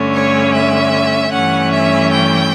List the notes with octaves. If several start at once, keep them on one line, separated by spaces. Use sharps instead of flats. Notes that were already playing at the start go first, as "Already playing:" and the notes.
Already playing: G2 D3 A3 C#4
C#5
E5
G2 E3 A3 C#4 F#5
E5
G5